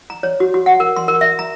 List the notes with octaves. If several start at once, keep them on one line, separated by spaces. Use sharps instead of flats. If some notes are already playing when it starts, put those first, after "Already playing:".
A#5
C#5
F#4
F#4
F#5
A#4
C6
A#4
E5
A#5